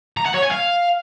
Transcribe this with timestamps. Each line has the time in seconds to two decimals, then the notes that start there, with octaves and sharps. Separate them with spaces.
0.17 A#5
0.26 F#5
0.34 C#5
0.43 G#5
0.52 F5